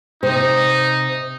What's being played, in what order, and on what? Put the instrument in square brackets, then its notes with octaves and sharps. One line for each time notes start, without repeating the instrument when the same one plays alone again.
[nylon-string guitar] C3 C5 [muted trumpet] D#4